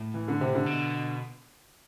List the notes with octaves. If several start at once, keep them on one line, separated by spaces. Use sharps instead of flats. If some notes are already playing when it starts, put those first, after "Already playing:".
Already playing: A2
E3
D3
C3
D3
B2